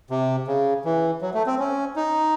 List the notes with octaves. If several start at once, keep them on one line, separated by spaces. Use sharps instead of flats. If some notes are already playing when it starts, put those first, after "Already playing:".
C3
C#3
E3
F#3
A3
C4
C#4
D#4